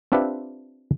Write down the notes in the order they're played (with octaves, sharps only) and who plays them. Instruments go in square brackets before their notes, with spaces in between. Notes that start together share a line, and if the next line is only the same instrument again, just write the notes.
[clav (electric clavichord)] C4 D4 F4 G4 B4 E5